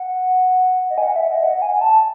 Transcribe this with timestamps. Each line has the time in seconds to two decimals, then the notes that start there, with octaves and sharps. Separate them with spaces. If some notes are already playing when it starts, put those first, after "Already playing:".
Already playing: F#5
0.90 D#5
0.98 G#5
1.03 F#5
1.16 E5
1.31 D#5
1.44 F#5
1.55 F#5
1.62 G#5
1.74 G#5
1.81 A5